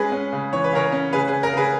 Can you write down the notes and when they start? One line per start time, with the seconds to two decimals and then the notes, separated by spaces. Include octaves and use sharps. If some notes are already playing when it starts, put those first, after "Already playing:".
Already playing: G#3 C#4 G#4 B4
0.12 C#4
0.33 C#3
0.53 E3 C#5
0.64 B4
0.73 C#3 A#4 C#5
0.92 C#4
1.13 C#3 G#4 B4
1.28 G#4 B4
1.33 C#3
1.43 A#4
1.53 C#3 G#4 B4